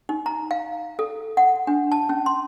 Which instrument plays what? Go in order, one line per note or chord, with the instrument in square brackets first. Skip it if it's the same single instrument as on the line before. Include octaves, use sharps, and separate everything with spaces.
[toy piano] D#4
A#5
F5
A4
F#5
D4
A5
C#4
C6